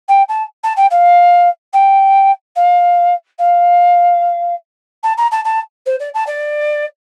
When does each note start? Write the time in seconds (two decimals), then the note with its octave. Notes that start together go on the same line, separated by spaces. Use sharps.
0.08 G5
0.28 A5
0.63 A5
0.76 G5
0.90 F5
1.73 G5
2.55 F5
3.38 F5
5.03 A5
5.17 A#5
5.31 A5
5.44 A5
5.86 C5
5.99 D5
6.14 A5
6.26 D5